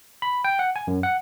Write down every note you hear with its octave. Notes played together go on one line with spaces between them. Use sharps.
B5
G5
F#5
G#5
F#2
F#5